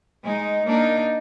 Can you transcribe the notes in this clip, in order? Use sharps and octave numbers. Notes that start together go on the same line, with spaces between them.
G#3 D#4
A#3 D4 D#4